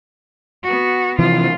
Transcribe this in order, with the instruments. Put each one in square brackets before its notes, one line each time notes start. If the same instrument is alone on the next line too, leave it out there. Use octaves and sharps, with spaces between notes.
[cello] B3 F#4
[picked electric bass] C3 E3 F3 [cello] F4